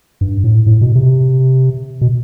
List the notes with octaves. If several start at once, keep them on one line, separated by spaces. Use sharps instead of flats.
G2
A2
A2
B2
C3
B2